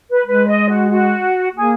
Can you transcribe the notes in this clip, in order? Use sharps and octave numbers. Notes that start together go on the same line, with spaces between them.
B4
G#3 B4
D#5
F#4
F#4
A#3 G#4